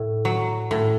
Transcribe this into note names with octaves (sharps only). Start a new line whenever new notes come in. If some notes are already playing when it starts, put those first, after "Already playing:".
Already playing: A2
F#3
A2